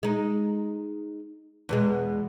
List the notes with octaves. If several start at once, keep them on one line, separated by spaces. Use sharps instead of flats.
G#3 D#4
E2 B2 G#3